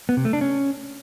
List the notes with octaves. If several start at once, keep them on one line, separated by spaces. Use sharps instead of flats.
B3
C3
A3
D4
C#4